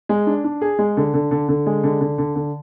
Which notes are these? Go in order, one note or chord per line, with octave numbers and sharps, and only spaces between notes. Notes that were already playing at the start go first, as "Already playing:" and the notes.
G#3
D4
D4
G#4
G#3
D3
D3
D3
D3
G#3
D3
D3
D3
D3